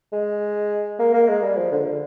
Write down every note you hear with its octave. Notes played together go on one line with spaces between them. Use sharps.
G#3
A#3
A#3
G#3
G3
F3
D3
D3